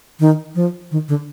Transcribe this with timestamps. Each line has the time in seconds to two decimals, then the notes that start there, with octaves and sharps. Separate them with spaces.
0.20 D#3
0.55 F3
0.91 D#3
1.08 D3